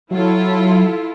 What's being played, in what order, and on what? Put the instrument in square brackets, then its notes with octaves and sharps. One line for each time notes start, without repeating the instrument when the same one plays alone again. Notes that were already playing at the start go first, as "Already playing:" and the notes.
[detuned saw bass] F#3 [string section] E4 F4 A4